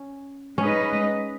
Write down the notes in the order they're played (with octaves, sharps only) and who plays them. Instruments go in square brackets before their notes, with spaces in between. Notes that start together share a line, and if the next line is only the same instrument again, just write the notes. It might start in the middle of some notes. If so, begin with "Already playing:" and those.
Already playing: [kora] C#4
[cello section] G#3 D#4 B4 D#5 [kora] C#4